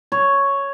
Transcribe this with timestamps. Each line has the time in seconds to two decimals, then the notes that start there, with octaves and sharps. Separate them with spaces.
0.12 C#5